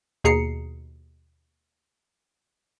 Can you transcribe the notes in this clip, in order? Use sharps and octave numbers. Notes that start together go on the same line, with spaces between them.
D#2 B2 G#4 A#5 C7 C#7